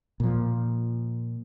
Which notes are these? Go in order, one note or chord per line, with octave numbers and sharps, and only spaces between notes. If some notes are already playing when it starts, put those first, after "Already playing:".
A#2 F3